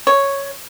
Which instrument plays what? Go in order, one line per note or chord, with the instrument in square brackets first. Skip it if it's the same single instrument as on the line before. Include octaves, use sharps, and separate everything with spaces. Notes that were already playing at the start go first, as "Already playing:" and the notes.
[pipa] C#5